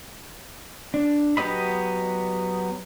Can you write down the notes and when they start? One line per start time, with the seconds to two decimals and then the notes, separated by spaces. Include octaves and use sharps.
0.94 D4
1.37 F#3 B3 G4 D#5 B5